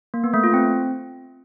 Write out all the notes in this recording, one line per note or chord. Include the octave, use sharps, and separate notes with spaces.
A#3
B3
A3
F4
C4